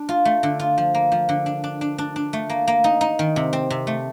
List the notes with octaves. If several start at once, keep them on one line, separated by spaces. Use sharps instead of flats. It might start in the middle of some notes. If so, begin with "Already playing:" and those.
Already playing: D4
F4
A3
D3
F4
F3
A#3
F3
D3
D4
D4
D4
D4
D4
A3
A#3
A#3
D#4
D#4
D#3
C3
C4
C3
A3